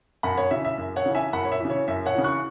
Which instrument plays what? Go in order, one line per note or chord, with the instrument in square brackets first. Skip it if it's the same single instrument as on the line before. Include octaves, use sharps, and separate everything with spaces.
[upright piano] F#2 F#5 B5
C#5 F#5
C#3 E3 E5
E5
F#2
C#5 F#5
C#3 E3
E5 G#5
F#2 F#5 B5
C#5
E5
C#3 E3
C#5
F#2 E5
C#5 F#5
C#3 E3
C#6 F#6